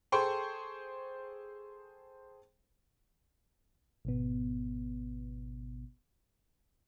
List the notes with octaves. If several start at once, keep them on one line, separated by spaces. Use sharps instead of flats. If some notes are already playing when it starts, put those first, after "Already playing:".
G#4 A4 C5 G5 C6 C#6
G#1 B2 B3